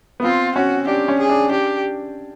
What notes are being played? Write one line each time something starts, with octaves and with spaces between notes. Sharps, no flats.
B3
C4 F4
C#4 F#4
D4 G4
C#4
G#4
D4
D4 G4